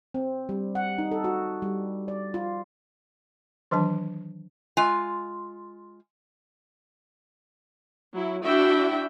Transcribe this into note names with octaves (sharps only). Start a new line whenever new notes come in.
C4
G3
F#5
D#4
A4
F#4
G3
D5
F4
D#3 E3 F#3 D4 A5
G#3 F4 G#5
F#3 E4
D4 E4 F#4 E5 G5